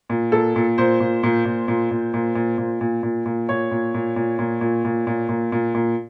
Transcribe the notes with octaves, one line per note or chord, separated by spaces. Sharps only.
A#2
A#2 A4
A#2
A#2 C5
A#2
A#2
A#2
A#2
A#2
A#2
A#2
A#2
A#2
A#2
A#2
A#2 C#5
A#2
A#2
A#2
A#2
A#2
A#2
A#2
A#2
A#2
A#2